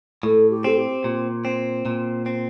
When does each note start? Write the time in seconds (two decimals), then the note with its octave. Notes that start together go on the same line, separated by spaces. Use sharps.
0.23 A2 A4
0.50 G4
0.64 C4 A4
0.77 G4
1.04 A#2
1.45 C4
1.85 A#2
2.26 C4